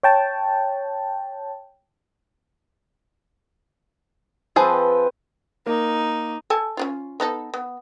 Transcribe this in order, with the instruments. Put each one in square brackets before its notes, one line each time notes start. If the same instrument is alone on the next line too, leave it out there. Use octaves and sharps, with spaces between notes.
[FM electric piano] C#5 G5 A5
[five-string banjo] F3 G#4 A5 [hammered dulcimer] C4 B4 G5
[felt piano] A#3 [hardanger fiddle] D#4
[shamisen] A4 G#5 A5
C#4 D4 F4
B3 D#4 A4
B3